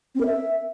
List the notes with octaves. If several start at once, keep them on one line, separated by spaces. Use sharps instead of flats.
C4
A#4
E5